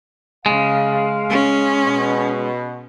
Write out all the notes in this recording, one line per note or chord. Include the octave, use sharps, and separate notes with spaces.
C#3 G#3 F5
C#4
B2